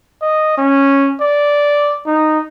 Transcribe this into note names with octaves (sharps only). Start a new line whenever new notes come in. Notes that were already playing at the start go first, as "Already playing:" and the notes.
D#5
C#4
D5
D#4